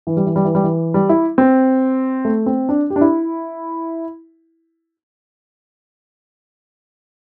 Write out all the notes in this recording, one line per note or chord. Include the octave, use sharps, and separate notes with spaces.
E3
G3
E3
G3
E3
G3
E3
G3
E4
C4
A3
C4
D4
G4
D4
E4